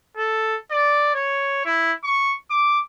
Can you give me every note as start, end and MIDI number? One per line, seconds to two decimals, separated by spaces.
0.17 0.56 69
0.71 1.10 74
1.14 1.64 73
1.65 1.92 64
2.04 2.34 85
2.50 2.79 86